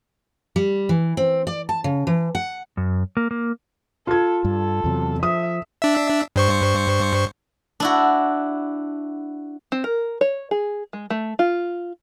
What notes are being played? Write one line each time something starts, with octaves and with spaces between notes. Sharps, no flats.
G3
E3
C4
D5
A5
C#3
E3
F#5
F#2
A#3
A#3
F4 A4 G#6
G2 A4
E2 C3 F#3
F3 E5 D#6
D4 E5
G2 C5 C#6
D4 E4 F#4
C4
A#4
C#5
G#4
G#3
A3
F4